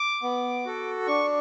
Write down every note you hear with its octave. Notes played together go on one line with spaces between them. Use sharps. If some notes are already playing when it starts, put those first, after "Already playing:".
Already playing: D6
B3
F#4 A4
D4 C#6